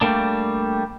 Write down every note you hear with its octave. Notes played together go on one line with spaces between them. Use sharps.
G3 A3 A#3 D4